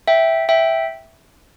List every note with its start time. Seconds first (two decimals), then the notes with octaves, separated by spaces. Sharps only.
0.07 E5 G5
0.49 E5 G5